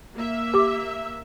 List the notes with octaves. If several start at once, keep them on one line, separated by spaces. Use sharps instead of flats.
A#3 E5
G4 D6